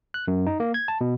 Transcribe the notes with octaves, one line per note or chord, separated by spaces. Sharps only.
F#6
F#2
D#4
A#3
G#6
A5
B2